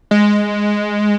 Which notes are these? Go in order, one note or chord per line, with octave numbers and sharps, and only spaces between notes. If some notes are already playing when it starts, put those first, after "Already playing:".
G#3